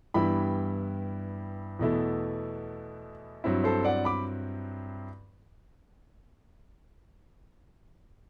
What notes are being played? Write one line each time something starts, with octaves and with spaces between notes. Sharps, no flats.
G2 E3 G3 B3 E4 G5 B5
E2 B2 A3 E4
G2 F#3 C4 E4
A4 C5
D5 F#5
B5 D6